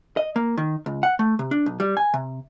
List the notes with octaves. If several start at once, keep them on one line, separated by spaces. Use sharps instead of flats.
D#5
A#3
D#3
C#2
F#5
A3
C3
D4
B1
G3
G#5
C3